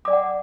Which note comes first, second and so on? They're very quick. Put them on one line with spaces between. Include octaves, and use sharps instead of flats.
D6 D5 G#5 F#5